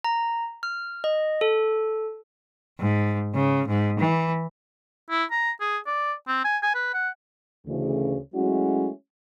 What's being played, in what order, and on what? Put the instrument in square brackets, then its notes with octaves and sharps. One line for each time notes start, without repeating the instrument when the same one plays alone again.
[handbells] A#5
F6
D#5
A4
[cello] G#2
C#3
G#2
E3
[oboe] E4
A#5
G#4
D5
C4
G#5
G#5
B4
F#5
[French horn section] D2 C#3 E3
F#3 G#3 A3 C#4 E4 F#4